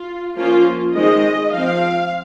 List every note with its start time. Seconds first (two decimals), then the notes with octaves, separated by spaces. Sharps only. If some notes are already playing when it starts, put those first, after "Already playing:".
Already playing: F4
0.36 F3 A#3 C#4 F4
0.95 D#3 G#3 C4 D#5
1.53 F3 C4 F5